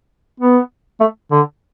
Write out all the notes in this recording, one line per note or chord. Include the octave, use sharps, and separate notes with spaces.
B3
A3
D3